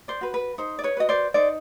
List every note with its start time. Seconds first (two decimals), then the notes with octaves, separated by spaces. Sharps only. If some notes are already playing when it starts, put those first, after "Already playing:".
0.08 C5 D5
0.21 F#4 B4
0.34 B4
0.58 D#4 C5
0.79 D5
0.83 B4 C#5
0.97 F#4 B4 D#5
1.09 C5 D5
1.34 D#4 C5 D5